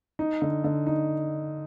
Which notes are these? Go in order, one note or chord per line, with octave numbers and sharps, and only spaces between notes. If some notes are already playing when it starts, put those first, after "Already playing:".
D#4
D3
D3
D#4